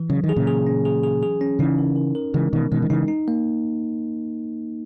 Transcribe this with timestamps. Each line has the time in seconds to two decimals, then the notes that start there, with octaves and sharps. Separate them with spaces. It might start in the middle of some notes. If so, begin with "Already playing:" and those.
Already playing: E3
0.10 C#3 F#3
0.24 D#3
0.29 G#4
0.36 A#2 C#3
0.47 G#4
0.67 C#4
0.85 G#4
1.03 G#4
1.23 G#4
1.41 C#4
1.59 C#3 E3 D#4
1.78 A#4
1.96 A#4
2.15 A#4
2.34 C#3 E3 G#3
2.53 B2 D#3 E3
2.72 B2 D#3 G#3
2.82 D#3
2.90 C#3 E3 D#4
3.08 D#4
3.28 A#3